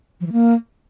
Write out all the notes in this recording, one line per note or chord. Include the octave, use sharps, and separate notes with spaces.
F3
E3
A#3